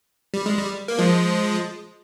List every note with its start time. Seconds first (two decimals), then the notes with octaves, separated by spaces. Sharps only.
0.34 G3
0.46 G#3
0.57 G3
0.88 A#3
0.98 F3 G#3